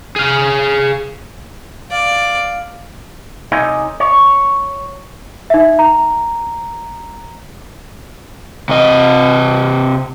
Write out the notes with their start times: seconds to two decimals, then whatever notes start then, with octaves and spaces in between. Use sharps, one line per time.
0.16 G#4 F5
1.91 D5 F5
3.52 C3 D#4 A4 C#5 D#5 G#5
4.00 C#5
5.50 D#4 E5
5.79 A#5
8.69 C3 D#5